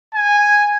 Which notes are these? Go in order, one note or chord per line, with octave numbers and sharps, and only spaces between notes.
G#5